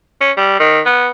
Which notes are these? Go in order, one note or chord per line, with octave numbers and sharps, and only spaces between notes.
C#4
G3
D#3
B3